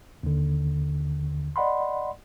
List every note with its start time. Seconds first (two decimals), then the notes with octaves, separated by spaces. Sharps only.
0.23 D#2 D3
1.56 D5 D#5 F#5 B5 C6